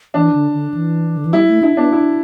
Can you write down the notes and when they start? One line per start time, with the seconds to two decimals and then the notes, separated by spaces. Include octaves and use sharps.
0.14 E3 D4
0.34 D3
0.54 D3
0.74 E3
1.17 D3
1.25 E3
1.33 G3 E4
1.48 A3
1.62 D4 E4
1.77 B3 D4
1.92 D4 E4